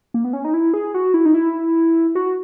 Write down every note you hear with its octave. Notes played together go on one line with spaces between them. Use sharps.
A#3
B3
C#4
D#4
E4
G#4
F#4
E4
D#4
E4
F#4